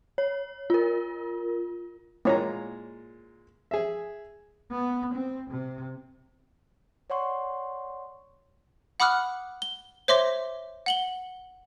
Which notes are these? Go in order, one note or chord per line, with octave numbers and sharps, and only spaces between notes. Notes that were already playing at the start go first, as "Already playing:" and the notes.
C#5
F4 A#4
A#2 G#3 A#3 E4 C#5 A#5
G#4 E5
B3
C4
C3
C#5 D5 F#5 C6 C#6
F#5 B5 D6 D#6 F6 F#6
G7
C5 C#5 E5 C6 D6 A#6
F#5 F#7 G7